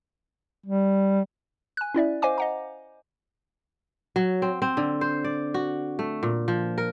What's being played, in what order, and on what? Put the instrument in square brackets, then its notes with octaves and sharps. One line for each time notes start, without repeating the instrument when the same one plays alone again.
[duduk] G3
[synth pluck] G#5 F#6
C#4 E4 D5 E5
C5 D#5 F5 G#5 D6
D#5 F#5 A#5
[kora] F#3
C4
C4
D3
C5
D5
F#4
A3
A#2
F3
A#4